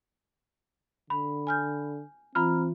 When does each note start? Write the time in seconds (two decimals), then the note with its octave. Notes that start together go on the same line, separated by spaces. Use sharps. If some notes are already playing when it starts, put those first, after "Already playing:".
1.10 D3 B5
1.47 G#5 F6 G6
2.35 E3 C4 F4 A#5 B5 F6